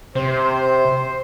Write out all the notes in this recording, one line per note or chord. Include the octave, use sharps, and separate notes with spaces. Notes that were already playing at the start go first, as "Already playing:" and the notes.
C3 C5